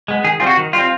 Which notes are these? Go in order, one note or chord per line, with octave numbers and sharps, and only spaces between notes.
G#3 B3
D#3 G#4
G3 C4 F4
F#4
D#3
G3 C4 F4